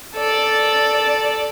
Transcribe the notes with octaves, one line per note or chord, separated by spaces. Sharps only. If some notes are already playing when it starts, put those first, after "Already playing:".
A4 D5